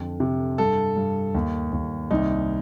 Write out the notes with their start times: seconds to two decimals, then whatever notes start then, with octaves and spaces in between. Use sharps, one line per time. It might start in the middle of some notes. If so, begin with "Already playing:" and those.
Already playing: F2 D3
0.20 C3
0.58 G2 A4
0.96 G2
1.34 D#2
1.72 D#2
2.11 C2 D#4